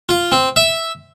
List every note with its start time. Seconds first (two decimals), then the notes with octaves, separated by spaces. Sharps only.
0.09 F4
0.32 C4
0.56 E5